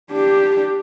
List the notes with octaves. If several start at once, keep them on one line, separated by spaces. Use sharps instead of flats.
D4 G4